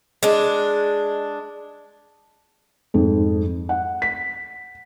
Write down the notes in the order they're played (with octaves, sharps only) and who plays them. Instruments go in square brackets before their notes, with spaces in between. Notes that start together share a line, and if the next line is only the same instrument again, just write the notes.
[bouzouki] G#3 D4
[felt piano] F2 G#2
F#5
B6